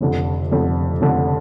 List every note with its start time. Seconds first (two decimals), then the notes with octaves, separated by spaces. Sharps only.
0.01 F1 F2 D3
0.51 F1 F2 D3
1.01 F1 F2 D3